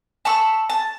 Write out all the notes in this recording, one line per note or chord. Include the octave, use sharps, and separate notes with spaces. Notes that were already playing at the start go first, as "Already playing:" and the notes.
A5 B5 C#6 E6
A5